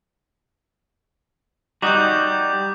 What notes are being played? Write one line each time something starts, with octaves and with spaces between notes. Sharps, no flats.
G3 D#4 F#4 D6 D#6 G6